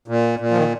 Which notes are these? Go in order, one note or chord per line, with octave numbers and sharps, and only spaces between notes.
A#2
A#2
F3
D#3